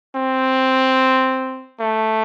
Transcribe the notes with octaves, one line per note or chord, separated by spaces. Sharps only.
C4
A3